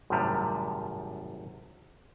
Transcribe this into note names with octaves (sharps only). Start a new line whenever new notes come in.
G#1 F#2 A2 C3 F3 G3